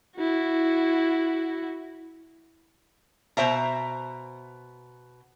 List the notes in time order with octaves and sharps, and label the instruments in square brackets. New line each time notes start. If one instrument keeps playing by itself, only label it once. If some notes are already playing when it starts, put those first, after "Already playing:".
[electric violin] E4 F#4
[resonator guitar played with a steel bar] B2 C5 E5 A#5